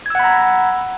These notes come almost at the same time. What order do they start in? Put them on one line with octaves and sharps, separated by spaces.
G#6 E6 F#5 B5 A#5